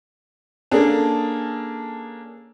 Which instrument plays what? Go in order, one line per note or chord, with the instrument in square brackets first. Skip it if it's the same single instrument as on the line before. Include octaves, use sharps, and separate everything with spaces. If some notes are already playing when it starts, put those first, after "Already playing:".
[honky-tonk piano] A#3 D4 [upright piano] C#4 G#4 A4